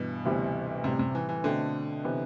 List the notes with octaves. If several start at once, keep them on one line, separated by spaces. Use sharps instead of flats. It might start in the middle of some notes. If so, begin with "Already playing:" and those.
Already playing: G2 B2 E3 B3
D2 C3 E3 G3 B3
A2 C3 G3 C4
C3
E3
E3
B2 D3 A3 C4
C3 E3 B3